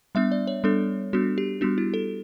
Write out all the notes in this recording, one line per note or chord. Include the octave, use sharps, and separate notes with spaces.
G3 B3 D4 E5
D5
C#5
G3 B3 D4 A4
G3 B3 D4 F#4
G4
G3 B3 D4 F#4
E4
A4